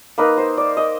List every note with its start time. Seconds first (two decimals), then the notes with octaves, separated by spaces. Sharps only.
0.18 A#3 D#4 B4
0.38 C5
0.57 D5
0.77 D#5